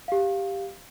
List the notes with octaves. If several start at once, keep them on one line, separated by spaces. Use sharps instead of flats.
G4 F5